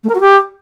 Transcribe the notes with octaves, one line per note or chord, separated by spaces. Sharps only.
A3
A#4
F#4
G4